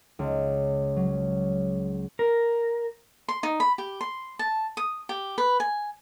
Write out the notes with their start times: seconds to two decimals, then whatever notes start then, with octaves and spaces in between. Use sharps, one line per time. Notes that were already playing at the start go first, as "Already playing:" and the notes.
0.19 C#2
0.96 F#3
2.19 A#4
3.28 C6
3.43 D#4
3.60 B5
3.78 G4
4.01 C6
4.39 A5
4.77 D#6
5.09 G4
5.38 B4
5.60 G#5